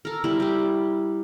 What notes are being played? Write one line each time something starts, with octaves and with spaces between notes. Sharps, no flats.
A4 A#4
G3 E4 A#4
G3 G4